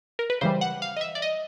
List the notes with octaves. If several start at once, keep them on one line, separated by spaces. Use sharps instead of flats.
A#4
B4
C#3 E3 G3 C5
F#5
F5
D#5
E5
D5
D#5